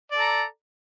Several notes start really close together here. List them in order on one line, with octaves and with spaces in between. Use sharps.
D5 A4 A#5